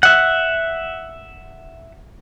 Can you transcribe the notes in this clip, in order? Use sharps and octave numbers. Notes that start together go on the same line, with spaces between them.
E5 F#5